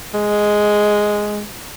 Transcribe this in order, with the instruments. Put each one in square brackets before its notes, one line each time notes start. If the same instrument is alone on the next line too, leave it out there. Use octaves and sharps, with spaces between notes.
[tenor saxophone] G#3